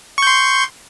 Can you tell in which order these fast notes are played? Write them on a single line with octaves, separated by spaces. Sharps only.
C#6 G6 C6